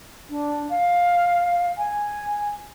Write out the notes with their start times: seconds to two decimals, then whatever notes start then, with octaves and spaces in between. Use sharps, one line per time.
0.30 D4
0.70 F5
1.78 G#5